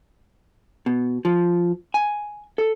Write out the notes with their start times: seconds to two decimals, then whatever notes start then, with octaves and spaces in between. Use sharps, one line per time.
0.86 B2
1.25 F3
1.94 G#5
2.58 A4